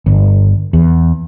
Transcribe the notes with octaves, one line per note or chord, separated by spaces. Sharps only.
G1
E2